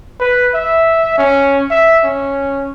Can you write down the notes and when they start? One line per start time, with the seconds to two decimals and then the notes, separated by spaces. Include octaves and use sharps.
0.20 B4
0.54 E5
1.18 C#4
1.71 E5
2.04 C#4